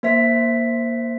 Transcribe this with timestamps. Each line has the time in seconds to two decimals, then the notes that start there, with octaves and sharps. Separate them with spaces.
0.03 A#3 C5 E5 B6